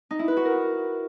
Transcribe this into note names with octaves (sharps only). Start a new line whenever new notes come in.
D#4
E4
B4
F#4
A#4